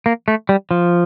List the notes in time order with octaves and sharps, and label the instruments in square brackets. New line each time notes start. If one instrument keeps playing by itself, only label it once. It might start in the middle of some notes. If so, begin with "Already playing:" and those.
[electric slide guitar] A#3
A3
G3
F3